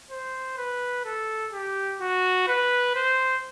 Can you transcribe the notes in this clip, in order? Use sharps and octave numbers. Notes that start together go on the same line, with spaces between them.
C5
B4
A4
G4
F#4
B4
C5